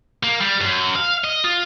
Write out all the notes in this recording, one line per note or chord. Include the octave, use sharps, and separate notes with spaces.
A#3
G3
F#2
F5
D#5
F4